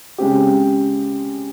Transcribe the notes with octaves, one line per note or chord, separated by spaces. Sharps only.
C#3 G#3 C4 G4